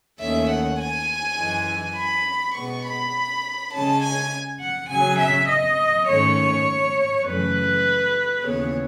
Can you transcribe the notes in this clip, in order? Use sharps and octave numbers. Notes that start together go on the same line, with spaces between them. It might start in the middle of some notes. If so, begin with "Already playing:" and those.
D#2 D#3 A3 C#4 E5
F#5
G#5
F#2 E3 G#3
B5
B2 G#3 B3 C#6
B5
C#3 G#3 C#4 A5
G#5
F#5
C#3 F#3 C#4 G#5
E5
D#5
G#2 D#3 A3 C#4 C#5
F#2 C#3 E3 A3 B4
D#2 C#3 E3 B3 C#5